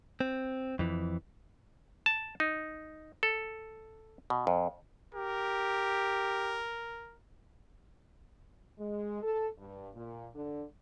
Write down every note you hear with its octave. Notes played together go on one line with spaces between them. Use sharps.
C4
F2 E3
A5
D#4
A4
B2
F2
G4 A#4
G#3
A4
G2
A#2
D3